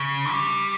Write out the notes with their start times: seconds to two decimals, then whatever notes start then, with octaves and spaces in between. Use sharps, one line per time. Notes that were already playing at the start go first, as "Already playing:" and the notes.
Already playing: C#3
0.32 G3